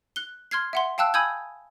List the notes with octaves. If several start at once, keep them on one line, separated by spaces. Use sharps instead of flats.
F#6 G7
C6 F6 G#6 C7
E5 F#5 C6
F5 G5 A5 E6 F#6
G#5 B5 D#6 E6 G6 G#6